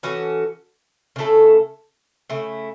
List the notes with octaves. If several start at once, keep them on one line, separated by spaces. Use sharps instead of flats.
E3 C#4 F#4 A4
C#3 A3 E4 A4
C#3 A3 E4